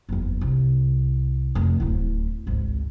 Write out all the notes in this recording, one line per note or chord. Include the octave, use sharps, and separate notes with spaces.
F#1 E2
C2
F1
D1 E4
G#1 C#2